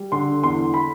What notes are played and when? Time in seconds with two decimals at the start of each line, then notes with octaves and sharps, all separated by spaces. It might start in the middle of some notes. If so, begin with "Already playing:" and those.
Already playing: G3
0.12 D3 C6
0.43 E2 C6
0.74 B5